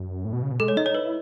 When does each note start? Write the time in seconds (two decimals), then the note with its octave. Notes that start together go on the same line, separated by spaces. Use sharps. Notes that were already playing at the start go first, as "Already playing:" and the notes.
Already playing: F#2
0.25 A2
0.33 B2
0.43 C#3
0.51 B2
0.60 G#3 A4
0.68 C#5
0.77 D#4 D#5
0.86 C#5
0.94 E4 B4